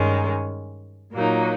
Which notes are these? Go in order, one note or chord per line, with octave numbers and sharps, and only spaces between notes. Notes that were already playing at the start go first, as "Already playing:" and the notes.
Already playing: G2 D#3 G#3 C#4
A#2 F#3 A#3 D#4